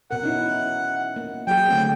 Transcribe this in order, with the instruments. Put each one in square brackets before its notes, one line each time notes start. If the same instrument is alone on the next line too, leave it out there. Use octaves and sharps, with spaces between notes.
[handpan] B2 A#4 [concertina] F#5
[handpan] C#4 D#4 E4
A#3
[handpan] F#3 F#4 G#4 [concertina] G5
[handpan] D3 A3 C4